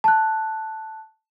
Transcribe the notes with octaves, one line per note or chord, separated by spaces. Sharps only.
A5 F#6